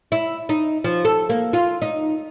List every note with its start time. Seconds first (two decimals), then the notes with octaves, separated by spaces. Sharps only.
0.12 E4
0.49 D#4
0.84 F3
1.05 A4
1.29 A#3
1.53 F4
1.82 D#4